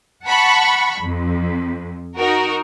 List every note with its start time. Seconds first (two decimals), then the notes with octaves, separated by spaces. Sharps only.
0.25 F#5 A5 B5 C#6
1.00 F2
2.18 D#4 F#4 A#4